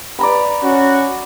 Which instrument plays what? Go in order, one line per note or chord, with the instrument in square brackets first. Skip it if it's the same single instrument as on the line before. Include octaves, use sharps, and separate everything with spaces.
[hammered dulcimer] D5 A#5 B5
[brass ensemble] C#4 F#4